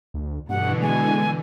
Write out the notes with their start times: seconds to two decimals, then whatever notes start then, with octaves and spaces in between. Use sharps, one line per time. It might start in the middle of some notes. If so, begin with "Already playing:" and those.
0.14 D2
0.49 G2 B2 D3 E3 F#5
0.82 G#3 G#5